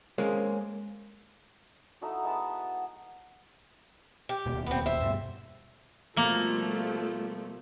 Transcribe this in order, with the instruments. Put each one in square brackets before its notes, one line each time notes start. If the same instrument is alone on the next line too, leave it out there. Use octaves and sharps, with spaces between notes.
[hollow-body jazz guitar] G#3 A#3 C4 C#4 G#4 A#4
[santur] A3 D#4 E4 F#4
G#3 B3 A5 B5
[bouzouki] G4
[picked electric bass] D#1 B2 A#3
[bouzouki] B3 C4
C5 E5
[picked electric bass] G2 B2 G3
[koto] B2 A#3 [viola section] F3 G3 A3